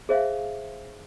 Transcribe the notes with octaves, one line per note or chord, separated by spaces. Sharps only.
G#4 C5 E5 F5